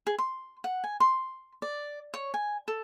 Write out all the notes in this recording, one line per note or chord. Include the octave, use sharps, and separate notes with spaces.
G#4
C6
F#5
G#5
C6
D5
C#5
G#5
A4